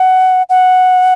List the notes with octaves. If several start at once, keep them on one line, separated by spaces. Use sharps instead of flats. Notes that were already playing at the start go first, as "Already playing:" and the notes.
Already playing: F#5
F#5